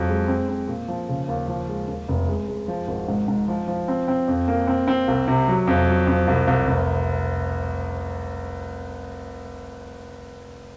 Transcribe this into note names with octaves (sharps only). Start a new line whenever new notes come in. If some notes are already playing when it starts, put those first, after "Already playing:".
Already playing: F2 F#3
G#3
C4
C4
A#2
F3
C#3
D#2
F3
G#3
D#2
F1
G#3
G#3
F3
G#1
G#2
G#2
F3
F3
C4
C4
F2
A#3
C4
C4
C2
C3
F#3
F2
F#3
F2
C2
C2
F1